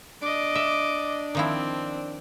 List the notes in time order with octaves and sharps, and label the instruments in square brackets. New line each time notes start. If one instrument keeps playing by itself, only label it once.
[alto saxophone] D4 [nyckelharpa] D#5 D6
[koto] E5
[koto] D#3 F3 E4 [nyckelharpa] C4